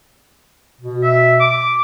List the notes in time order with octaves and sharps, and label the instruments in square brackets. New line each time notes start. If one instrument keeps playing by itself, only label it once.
[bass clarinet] B2
[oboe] E5
D6